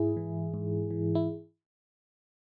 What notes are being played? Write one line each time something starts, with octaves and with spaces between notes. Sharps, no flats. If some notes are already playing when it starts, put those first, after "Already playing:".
Already playing: G#2 E4 G#4
E3
G#2
E3
E4